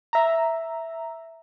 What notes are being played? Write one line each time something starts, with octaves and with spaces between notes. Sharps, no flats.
E5 A#5